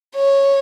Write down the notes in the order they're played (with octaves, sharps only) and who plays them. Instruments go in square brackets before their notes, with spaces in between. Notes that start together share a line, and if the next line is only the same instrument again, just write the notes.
[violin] C#5